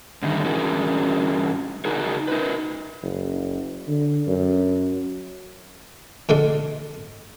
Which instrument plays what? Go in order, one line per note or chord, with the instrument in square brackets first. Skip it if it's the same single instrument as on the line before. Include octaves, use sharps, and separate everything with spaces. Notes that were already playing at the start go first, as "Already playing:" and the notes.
[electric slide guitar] G#2 D3 D#3 G3 A3 D#4
G2 E3 C#4 F#4 G#4 A#4
C#3 D#4 F#4 G#4 A#4
D#4 A#4 B4
[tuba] F#1
D3
F#2
[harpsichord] A#2 D3 G#3 C6